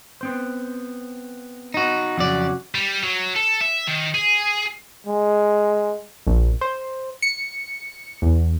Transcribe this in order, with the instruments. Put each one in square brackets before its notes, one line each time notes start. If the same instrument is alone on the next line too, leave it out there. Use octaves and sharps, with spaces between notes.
[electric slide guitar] B3 C4 C5
[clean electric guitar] D#4 F#4
[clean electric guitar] F2 D5 [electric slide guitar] C#3 F#3 F#4
[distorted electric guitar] G3
F#3
A4
E5
D#3
G#4
[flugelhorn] G#3
[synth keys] A#1
C5
C#7
E2